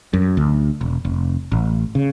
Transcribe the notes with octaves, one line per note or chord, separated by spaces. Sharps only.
F#2
D2
E1
F1
A1
C#3